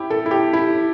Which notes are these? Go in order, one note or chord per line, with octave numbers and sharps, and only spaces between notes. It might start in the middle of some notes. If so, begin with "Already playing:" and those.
Already playing: E4 G4
A4
E4
G4
E4